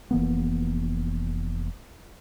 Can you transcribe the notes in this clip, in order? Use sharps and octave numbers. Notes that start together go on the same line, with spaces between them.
F1 E3 A#3 B3